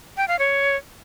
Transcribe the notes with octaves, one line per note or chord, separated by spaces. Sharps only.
G5
F5
C#5